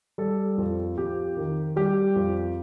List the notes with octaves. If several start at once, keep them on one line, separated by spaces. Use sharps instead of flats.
G3 A4
F2
F2 G4
D#3
G3 G4
F2